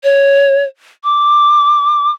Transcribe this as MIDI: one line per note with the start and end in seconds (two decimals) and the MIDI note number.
0.04 0.64 73
1.04 2.11 86